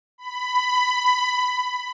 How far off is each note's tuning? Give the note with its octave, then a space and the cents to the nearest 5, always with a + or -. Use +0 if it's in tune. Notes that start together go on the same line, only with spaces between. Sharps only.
B5 +15